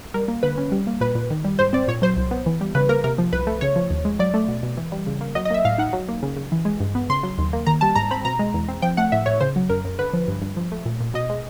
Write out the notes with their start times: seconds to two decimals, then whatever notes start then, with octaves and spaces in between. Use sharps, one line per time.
0.14 G3 A#4
0.28 A#3
0.43 D3 B4
0.57 C#4
0.72 G3
0.87 A#3
1.01 A#2 B4
1.15 A#2
1.30 D#3
1.44 G3
1.59 G#2 C5
1.73 C4 D5
1.88 A#2 C#5
2.02 F#3 C5
2.17 C2
2.31 B3
2.46 E3
2.61 G3
2.75 C#3 B4
2.89 A#3 A#4
3.04 C3 A#4
3.18 F3
3.33 C2 B4
3.47 A3
3.61 C#3 C#5
3.76 F3
3.90 D#2
4.05 G#3
4.19 F#3 D5
4.34 A3
4.48 B2
4.63 B2
4.77 E3
4.92 G3
5.07 C#3
5.21 A#3
5.35 F#3 D#5
5.45 D#5
5.51 A#3 E5
5.65 A2 F5
5.78 D#4 F#5
5.93 F#3
6.08 A#3
6.23 C#3
6.37 C#3
6.52 E3
6.65 G#3
6.80 G2
6.95 B3
7.09 C#3 C6
7.23 F#3
7.38 D#2
7.53 A#3
7.66 D#3 A#5
7.81 G3 A5
7.95 G#2 A#5
8.11 C4 B5
8.25 B2 A#5
8.39 G#3
8.54 E2
8.68 C4
8.82 F3 G5
8.97 A3 F#5
9.12 A2 E5
9.26 A2 C#5
9.41 C#3 C5
9.56 F#3
9.69 F#2 A#4
9.84 F#2
9.99 D3 B4
10.13 F3
10.28 G2
10.42 G2
10.57 F3
10.72 A3
10.85 A#2
11.00 A#2
11.14 B2 D#5
11.30 G#3